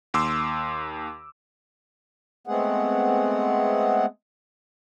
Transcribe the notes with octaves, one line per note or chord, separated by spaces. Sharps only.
D#2 C6 D6 E6
G#3 A3 B3 C4 G#4 F#5